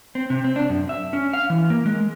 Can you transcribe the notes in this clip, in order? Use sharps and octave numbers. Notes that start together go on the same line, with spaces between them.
C4
C3
C4
D4
F#2
E5
C#4
F5
E3
A#3
G#3